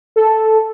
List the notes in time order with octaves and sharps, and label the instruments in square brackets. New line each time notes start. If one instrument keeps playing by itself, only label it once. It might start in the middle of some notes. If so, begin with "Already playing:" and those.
[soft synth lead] A4